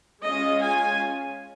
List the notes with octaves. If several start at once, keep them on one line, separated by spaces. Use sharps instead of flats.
G#3 C#4 F4 D#5
G#5